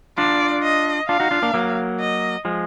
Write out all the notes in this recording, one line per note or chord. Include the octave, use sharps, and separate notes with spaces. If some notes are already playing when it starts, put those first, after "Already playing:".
D4 F4 D5
D#5
D4 F4 F5
D#4 F#4
D4 F4
A#3 D4
F#3 A#3
D#5
F3 G#3